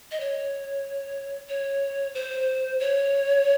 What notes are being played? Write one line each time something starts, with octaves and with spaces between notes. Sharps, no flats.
D#5
C#5
C#5
C5
C#5